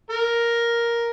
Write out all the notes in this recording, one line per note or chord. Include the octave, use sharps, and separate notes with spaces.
A#4